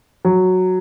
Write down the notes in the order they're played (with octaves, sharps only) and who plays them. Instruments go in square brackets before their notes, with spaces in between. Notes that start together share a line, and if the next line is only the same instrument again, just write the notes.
[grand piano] F#3